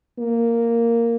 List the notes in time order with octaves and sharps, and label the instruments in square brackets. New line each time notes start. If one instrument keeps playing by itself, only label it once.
[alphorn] A#3